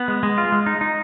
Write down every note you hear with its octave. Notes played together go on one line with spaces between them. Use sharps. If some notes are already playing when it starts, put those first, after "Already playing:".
Already playing: B3
G#3
G#3
F4
G#3
D#4
D#4